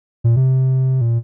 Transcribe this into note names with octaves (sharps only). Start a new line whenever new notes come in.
A#2
C3
A#2